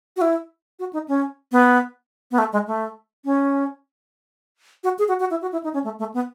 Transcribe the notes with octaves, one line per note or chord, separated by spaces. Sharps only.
F#4
E4
F#4
D#4
C#4
B3
B3
A3
G#3
A3
C#4
F#4
G#4
F#4
F#4
E4
F#4
E4
D#4
C#4
A3
A3
B3